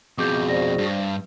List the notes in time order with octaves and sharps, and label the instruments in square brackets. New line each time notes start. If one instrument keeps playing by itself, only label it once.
[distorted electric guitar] F2 B2 [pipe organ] F#4 G#4 [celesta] D6 G6
[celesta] C5 D5 A#6
[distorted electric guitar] G2